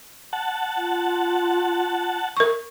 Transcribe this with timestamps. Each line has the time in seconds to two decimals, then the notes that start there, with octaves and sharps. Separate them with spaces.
0.33 F#5 A5
0.77 F4
2.37 A#4 C#6